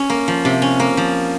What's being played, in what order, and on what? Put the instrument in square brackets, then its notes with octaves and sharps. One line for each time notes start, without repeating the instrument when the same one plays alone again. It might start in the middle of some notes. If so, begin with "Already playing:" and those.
Already playing: [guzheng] C#4
A#3
F3
C3
C#4
A#3
F3